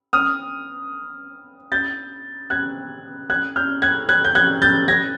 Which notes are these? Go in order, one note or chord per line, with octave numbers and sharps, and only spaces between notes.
D#6 F6
G6 A6
F#6 G#6
F#6 G#6
F6 G6
F#6 G#6
F#6 G#6
G6
F#6 G#6
G6 A6
G#6 A#6